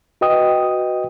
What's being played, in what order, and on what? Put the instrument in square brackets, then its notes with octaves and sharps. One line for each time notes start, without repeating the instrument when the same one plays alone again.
[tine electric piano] F#4 B4 D#5 G5 D#6